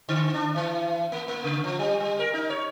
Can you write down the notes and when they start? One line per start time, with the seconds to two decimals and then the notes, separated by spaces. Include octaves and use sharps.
0.09 D3
0.34 D4
0.56 E3
1.12 A#3
1.28 A#3
1.44 C#3
1.64 F3
1.79 G3
2.00 G3
2.19 A#4
2.34 D#4
2.50 C#5